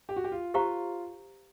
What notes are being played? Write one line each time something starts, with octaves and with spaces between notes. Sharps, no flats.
G4
F#4
G4
F4
F4 G4 C5 F5 A#5 C#6